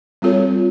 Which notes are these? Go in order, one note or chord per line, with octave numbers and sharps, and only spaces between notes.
G3 C4 F4 A4 C#5